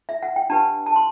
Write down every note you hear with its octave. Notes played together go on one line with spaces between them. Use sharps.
E5
F#5
G5
D4 G4 B4 A5
A5
C6